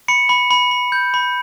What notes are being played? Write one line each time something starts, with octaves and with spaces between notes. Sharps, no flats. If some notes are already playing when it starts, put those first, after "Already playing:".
B5 C#7
B5
B5
B5
G6
B5